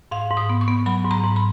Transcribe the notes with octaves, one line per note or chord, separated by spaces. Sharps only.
G#2 F5
G#2
D#6
B3
C#6
B3
F#3 B5
G#2
A#5
G#2
B5